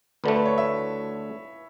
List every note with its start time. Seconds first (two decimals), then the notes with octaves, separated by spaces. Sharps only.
0.24 D2 D3 A3 B4
0.36 B4
0.46 C#5
0.58 E5